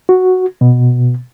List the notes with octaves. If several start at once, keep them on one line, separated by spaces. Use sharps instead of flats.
F#4
B2